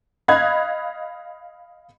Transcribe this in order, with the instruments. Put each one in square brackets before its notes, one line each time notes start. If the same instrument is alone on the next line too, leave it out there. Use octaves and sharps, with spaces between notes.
[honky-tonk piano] D#5 F5 B5 F#6 G#6